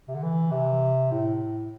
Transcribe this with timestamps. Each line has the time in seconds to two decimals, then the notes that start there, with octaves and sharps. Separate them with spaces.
0.08 C3
0.15 D3
0.22 E3
0.51 C3
1.11 A2